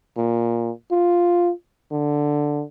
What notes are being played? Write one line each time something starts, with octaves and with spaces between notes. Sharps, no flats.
A#2
F4
D3